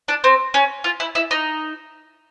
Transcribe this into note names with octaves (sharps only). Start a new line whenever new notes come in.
D4
C4
C#4
F4
E4
E4
D#4